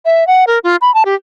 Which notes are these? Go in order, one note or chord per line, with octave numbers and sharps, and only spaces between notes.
E5
F#5
A#4
F4
B5
A5
G4